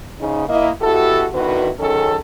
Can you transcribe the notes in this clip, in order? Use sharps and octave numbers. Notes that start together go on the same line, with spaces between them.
G#2 C#3 D#4
A#3 E4 D#5
B2 E4 F#4 G4 A4
B2 D3 D#3 E4 F#4 B4
F#2 D#3 C#4 G#4 A4